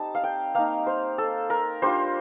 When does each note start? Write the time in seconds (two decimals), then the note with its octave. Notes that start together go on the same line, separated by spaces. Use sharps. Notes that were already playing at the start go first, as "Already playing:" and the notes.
Already playing: G3 C4 D#4 A5
0.15 F5
0.24 G5
0.55 A#3 D#4 F5
0.87 C5
1.18 A4
1.50 A#4
1.82 G3 D4 F4 C5